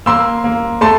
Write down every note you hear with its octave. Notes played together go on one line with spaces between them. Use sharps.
A#3 C6 E6
A#3
A3 A5 C6